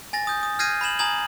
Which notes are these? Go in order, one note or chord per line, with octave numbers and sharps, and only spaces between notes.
G#5 A6 A#6
D#6 G6
D#6
F6 G6 G#6 A#6 C7 D#7
B5 G#6 E7 F#7
G#5 A#5 D#6 G#6 F#7